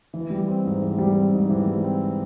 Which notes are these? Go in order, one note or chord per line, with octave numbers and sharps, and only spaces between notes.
E3
G3
C4
G#2
E3
G3
C4
G#2
E3
G3
C4